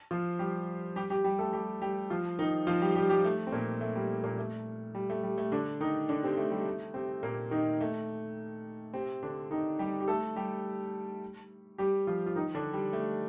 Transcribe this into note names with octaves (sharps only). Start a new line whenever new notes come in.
F3 F4
G3 G4
G3 G4
G3 G4
G3 G4
A3 A4
G3 G4
G3 G4
F3 F4
D#3 D#4
F3 F4
G3 G4
G3 G4
G3 G4
A3
C4
A#2 A#3
A3
G3
A#2 A#3
A3
G3
A3
G3
A3
D3 D4
D#3 D#4
D3 D4
C3 C4
A3
G3
A3
C3 C4
A#2 A#3
D#3 D#4
A3
C3 C4
D3 D4
D#3 D#4
G3 G4
G4
A3 A4
G3 G4
G3 G4
F3 F4
F4
D#3 D#4
D3 D4
G3
A3